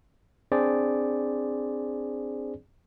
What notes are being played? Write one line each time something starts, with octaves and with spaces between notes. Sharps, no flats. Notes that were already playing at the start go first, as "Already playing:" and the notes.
C4 D4 G#4 C5 D5